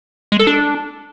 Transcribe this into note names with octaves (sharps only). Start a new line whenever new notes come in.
G#3
A4
D4